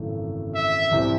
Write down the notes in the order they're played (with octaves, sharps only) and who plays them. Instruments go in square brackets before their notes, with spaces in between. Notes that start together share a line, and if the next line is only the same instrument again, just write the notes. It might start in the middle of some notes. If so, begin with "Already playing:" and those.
Already playing: [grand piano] G#1 F#2 C#3 E3 A3
[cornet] E5
[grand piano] C2 C3 E3 C4